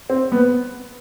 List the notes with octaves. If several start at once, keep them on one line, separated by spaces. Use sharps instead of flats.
C4
B3